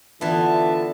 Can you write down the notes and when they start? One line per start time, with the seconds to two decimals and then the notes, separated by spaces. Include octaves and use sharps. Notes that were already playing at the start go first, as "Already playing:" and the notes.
0.21 D3 E3 B3 F4 E5 A5